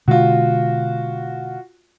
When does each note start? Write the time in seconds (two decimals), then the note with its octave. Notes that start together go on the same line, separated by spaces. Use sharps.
0.08 B2 D3 G#3 F4 F#4